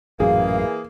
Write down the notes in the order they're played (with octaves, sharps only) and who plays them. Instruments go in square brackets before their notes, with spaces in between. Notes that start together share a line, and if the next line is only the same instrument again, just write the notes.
[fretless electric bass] A1 F#2 A#2 [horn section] E3 A#3 [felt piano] G#4 [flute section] F5